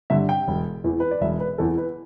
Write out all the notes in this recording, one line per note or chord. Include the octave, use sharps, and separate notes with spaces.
G2 D3 E5
G5
E1
E2 E3
B4
D5
E1 E5
B4
E2 E3 A4
B4